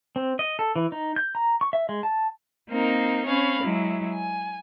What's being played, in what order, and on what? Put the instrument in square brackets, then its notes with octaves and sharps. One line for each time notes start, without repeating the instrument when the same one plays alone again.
[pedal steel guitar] C4
D#5
A4
E3
D#4
G6
A#5
C#6
E5
G#3
A5
[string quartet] A#3 C4 D#4 A#4
C4 C#4 C#5 F5 B5
F#3 G#3 E4
G#5